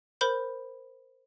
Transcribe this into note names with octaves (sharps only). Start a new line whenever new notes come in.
A#4 C5 B5 G6